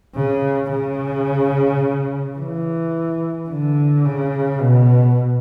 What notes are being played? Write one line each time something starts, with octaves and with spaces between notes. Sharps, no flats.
C#3
C#3
E3
D3
C#3
B2